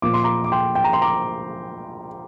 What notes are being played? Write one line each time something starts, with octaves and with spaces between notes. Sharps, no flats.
A#2 F3 A#3 D6
C6
A#5 D6
D6
G5 C6
G5
A#5
C6
A#5 D6